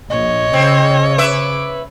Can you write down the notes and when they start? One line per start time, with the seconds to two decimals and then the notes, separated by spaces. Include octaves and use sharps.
0.10 A#1 C#5 D#5
0.53 C#3 C4
1.18 B4 E5 D6